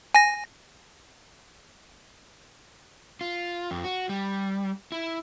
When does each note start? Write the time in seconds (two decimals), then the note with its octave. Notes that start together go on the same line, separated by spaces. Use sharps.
0.15 G#5 A#6
3.21 F4
3.71 F2
3.84 F#4
4.09 G3
4.92 E4